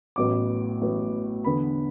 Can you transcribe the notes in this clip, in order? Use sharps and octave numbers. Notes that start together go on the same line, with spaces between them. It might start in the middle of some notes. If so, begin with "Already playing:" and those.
A1 A2 F#3 B3 D6
A1 A2 F#3 B3
E2 D3 B3 B5